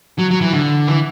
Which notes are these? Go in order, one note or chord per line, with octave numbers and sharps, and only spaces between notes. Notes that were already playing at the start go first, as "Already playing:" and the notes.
F#3
F#3
E3
D3
E3